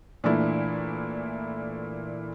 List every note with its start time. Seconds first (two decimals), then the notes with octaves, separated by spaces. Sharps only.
0.24 A#2 E3 A3 A#3 D4 E4